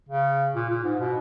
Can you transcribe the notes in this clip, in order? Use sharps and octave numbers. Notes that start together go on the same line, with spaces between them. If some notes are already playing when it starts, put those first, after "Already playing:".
C#3
A#2
A#2
G#2
B2